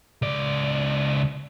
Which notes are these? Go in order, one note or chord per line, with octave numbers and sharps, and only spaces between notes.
C#2 D5